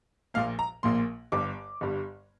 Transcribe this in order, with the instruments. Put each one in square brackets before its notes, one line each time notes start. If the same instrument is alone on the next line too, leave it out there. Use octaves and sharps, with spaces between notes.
[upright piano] A#1 A#2 A#3 F5
A#5
A#1 A#2 A#3 C6
G1 G2 G3 D6
G1 G2 G3